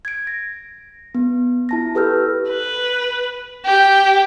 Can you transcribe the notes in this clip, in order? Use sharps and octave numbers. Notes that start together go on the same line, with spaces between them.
G#6 D7
A#6
B3
E4 A5 A#6
G4 A4 B4 E6 F6 G6
B4
G4